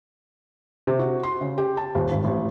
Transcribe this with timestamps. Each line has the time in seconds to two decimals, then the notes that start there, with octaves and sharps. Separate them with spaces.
0.87 C3
0.99 F#4
1.23 C6
1.41 C#3
1.58 G4
1.77 A5
1.95 D#1
2.11 G#1
2.24 A1